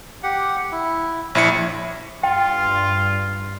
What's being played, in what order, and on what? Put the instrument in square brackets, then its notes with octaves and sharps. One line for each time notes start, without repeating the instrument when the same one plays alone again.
[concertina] G4 F#5
E4
[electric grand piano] A#1 E4 C#7 [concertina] C#5
[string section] G2 [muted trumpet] F4 [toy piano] G5